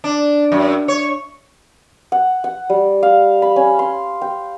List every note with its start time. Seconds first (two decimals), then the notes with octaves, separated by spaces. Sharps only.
0.04 D4
0.52 F#2
0.88 C#5
2.12 F#5
2.44 F#5
2.70 G3
3.03 F5
3.42 B5
3.56 C#4
3.79 C6
4.22 G5